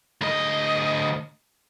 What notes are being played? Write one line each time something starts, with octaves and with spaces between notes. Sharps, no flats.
D2 D#5